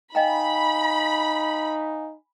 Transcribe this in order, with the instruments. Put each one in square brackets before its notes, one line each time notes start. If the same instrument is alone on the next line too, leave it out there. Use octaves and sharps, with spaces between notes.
[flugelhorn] D#4 [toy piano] D#5 G5 A#5 [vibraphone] F5 G#5 [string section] B5